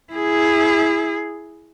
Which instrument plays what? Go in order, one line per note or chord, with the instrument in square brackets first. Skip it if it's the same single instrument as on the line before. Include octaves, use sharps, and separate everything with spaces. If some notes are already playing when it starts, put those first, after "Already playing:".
[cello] E4 G#4